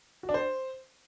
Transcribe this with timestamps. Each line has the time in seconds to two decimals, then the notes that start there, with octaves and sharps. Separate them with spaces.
0.23 F#4
0.29 D4
0.34 C5